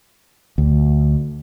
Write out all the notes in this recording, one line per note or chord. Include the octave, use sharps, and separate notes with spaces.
D2